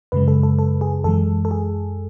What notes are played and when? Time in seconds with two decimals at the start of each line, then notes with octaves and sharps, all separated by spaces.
0.12 F#2 C#3 G#3 B4
0.28 A4
0.43 A4
0.59 A4
0.81 G#4
1.04 F#2 E3 G#3 A4
1.45 A4
1.51 G#4